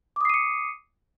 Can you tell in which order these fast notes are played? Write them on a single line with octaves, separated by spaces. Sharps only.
D6 D#6 C7 D#7 C#7